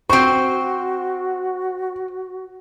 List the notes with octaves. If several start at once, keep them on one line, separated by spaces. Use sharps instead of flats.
C4 F#4 C5 C#6